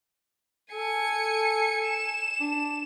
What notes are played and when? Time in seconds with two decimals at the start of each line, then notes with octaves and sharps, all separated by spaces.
0.72 A4 G#5 C#7
1.86 E7
2.40 D4